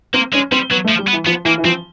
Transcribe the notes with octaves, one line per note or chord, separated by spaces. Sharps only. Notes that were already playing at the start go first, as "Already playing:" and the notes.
A#3 C4
G#3 C#4
G3 C4
F#3 B3
A3
F3
G3
B3
E3
F3 B3
E3 A#3
E3
F3 C4